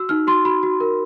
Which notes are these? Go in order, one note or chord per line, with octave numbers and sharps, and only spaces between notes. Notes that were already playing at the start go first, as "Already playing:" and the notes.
Already playing: F#4 E6
D#4 F6
F#4 C6
F#4 B5
F#4
A#4